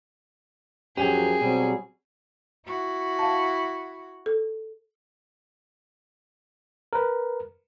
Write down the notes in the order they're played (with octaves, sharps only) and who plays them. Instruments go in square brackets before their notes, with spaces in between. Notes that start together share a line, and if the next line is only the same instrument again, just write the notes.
[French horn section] F#2 F3 [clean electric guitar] F#3 C#4 [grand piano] G4 [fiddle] G#4
[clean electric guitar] B2 [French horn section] F#3 G3 C4
[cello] E4 F#4
[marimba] F5 A5
A4
[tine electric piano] A#4 B4